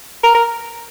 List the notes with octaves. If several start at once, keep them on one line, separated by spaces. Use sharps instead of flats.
A#4
A#4